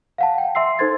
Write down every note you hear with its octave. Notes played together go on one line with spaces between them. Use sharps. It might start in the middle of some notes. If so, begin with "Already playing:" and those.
F5 F#5 A5
G5
E5 C6 E6 C7
D#4 A4 C5 C6 G#6 A6